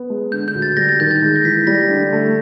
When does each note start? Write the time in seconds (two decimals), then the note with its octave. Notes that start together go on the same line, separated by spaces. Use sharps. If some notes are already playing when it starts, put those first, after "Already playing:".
Already playing: B3
0.10 G#3
0.32 D3 G6
0.48 G6
0.55 D2
0.62 A6
0.77 G3 A#6
0.89 A6
1.00 D#3 G6
1.11 A6
1.22 G#3
1.36 A#6
1.44 E3 B6
1.67 G3 A#6
1.90 D3
2.12 A3